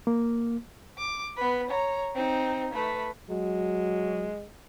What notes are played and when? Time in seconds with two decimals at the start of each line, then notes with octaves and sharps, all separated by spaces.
0.07 A#3
0.98 D6
1.37 B3 B4
1.70 C#5 A#5
2.16 C4 D#4
2.74 A3 B4
3.30 F#3 G#3